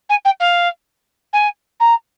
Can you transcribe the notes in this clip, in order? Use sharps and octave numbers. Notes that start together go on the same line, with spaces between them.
G#5
G5
F5
G#5
A#5